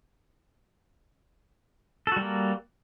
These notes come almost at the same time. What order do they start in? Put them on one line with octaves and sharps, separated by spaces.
A4 F#4 G3 A#3